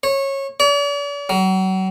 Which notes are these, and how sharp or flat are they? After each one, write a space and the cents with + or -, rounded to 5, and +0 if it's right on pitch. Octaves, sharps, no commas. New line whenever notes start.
C#5 -20
D5 -45
F#3 +35